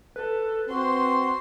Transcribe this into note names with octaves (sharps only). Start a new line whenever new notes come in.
A4 B4
C4 F#4 C5 C6